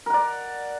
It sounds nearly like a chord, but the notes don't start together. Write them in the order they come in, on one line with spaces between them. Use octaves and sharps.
A#4 F#5 D5